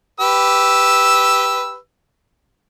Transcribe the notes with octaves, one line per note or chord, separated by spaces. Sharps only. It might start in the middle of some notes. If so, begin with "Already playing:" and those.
G4 B4 E6